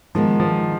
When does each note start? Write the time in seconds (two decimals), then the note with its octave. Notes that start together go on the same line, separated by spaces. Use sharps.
0.15 D#3 F3 G#3 B3
0.40 F3